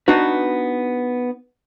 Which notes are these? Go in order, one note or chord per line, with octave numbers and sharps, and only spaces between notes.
B3 D4 D#4 F#4 B4